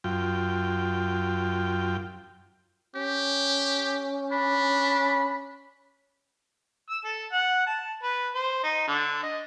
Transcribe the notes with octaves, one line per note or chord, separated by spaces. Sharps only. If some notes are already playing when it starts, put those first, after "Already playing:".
F#2 F4 G5
C#4 G4
D4 B5
E6
A4
F#5
A5
B4
C5
D#4
D3
D#5